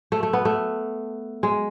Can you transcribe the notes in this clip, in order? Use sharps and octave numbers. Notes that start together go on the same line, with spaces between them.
A3
A3
B3
A3
G#3